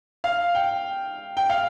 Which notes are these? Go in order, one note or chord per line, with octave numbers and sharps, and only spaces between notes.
F5
G5
G5
F5